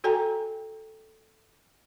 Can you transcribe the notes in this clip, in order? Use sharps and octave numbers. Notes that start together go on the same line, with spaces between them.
F#4 A4 G5 G#5 A#5